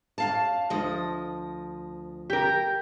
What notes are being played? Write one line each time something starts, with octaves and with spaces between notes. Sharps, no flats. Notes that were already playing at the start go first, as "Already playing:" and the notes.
F#2 F5 A5
D2 F3 D#5
G4 A#4